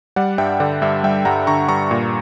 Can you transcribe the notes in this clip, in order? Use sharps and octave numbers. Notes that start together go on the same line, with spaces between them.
G3 D5 F#5
G2 E5 G5
D3 D5 F#5
G2 E5 G5
G3 E5 G5
G2 F#5 A#5
D3 A#5 C#6
G2 A#5 C#6
A#2